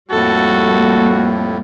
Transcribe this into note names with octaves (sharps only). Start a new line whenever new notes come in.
F2 A2 G3 A#3 F#4 A4